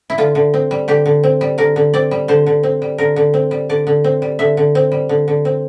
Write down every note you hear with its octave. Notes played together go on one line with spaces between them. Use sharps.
E4
D3 F4
D3
C4
G3
D3 G4
D3
C4
G3
D3 A#4
D3
C4 D5
G3
D3 C5
D3
C4
G3
D3 A#4
D3
C4
G3
D3 D5
D3
C4
G3
D3 E5
D3
C4
G3
D3
D3
C4